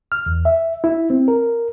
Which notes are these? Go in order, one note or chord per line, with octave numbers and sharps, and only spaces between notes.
F6
E2
E5
E4
C4
A#4